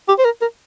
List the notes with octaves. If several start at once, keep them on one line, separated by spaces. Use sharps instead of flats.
G4
C5
A#4
A#4